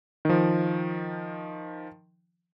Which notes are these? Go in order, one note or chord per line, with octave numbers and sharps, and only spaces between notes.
D#3 F3